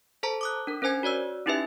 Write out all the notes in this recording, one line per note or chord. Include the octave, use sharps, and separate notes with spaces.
A4 C5 A5 A#5
D6 D#6 F#6
D4 A#4
C#4 A#4 C5 G#5 G#6
F#4 C#5 D5 E6
C#4 D#4 E4 G4 B4 E5